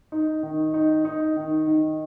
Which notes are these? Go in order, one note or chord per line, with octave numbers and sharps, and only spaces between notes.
D#4
D#3
D#4
D#4
D#3
D#3